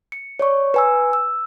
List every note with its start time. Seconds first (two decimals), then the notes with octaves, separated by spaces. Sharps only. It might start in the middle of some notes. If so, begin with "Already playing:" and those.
0.12 C#7
0.39 C#5 D5 C#6
0.74 B4 G#5 E6
1.13 E6